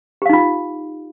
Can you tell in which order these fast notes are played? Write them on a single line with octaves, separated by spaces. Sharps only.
G4 F5 D#4 F4